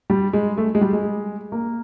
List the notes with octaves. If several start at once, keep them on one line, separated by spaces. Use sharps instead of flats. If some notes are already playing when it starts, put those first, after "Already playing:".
G3
G#3
A3
G#3
G3
G#3
A#3